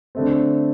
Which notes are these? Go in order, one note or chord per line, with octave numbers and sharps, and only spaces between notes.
D3 A3 C4